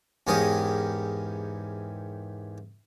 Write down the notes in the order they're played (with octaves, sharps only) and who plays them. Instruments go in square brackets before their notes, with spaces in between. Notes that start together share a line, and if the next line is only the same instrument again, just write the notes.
[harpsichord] E2 G#2 C#4 G4 A#4 D#6